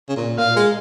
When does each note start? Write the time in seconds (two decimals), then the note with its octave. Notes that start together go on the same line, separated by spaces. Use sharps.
0.09 C#3
0.16 A#2
0.38 A#2 F5
0.56 G#3